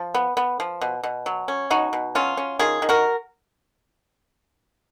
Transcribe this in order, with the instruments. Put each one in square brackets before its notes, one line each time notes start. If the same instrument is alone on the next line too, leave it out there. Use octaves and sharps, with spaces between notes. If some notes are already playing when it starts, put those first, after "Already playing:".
Already playing: [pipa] F3
B3
B3
F3
B2
B2
F#3
C#4
B2 D#4 F#4
B2
F#3 C#4 F4
C#4
D#3 F4 G#4
D#3
F#4 A#4